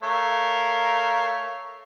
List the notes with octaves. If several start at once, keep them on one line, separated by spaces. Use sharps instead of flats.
A3 A#4 C#5 F5